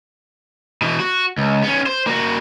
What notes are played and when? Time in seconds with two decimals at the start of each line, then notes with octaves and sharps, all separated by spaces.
0.82 B2 E3
1.00 F#4
1.38 C#2
1.64 B3 C#4
1.86 C5
2.07 A#3 F#4